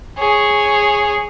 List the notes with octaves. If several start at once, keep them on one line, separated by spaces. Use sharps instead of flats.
G#4 C#5